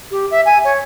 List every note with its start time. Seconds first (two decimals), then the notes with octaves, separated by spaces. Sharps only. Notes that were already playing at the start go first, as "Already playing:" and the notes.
0.11 G4
0.31 E5
0.46 G#5
0.64 C#5